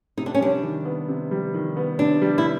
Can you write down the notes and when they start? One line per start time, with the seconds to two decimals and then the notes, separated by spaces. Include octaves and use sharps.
0.17 C3 D#4
0.26 D4
0.34 C#4
0.41 G3 D4
0.63 D#3
0.85 B3
1.08 C3
1.31 G3
1.54 D#3
1.77 B3
1.99 C3 D4
2.22 G3
2.38 E4